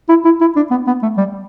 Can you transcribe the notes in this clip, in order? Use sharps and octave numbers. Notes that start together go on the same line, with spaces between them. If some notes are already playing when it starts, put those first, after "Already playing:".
E4
E4
E4
D4
B3
B3
A3
G3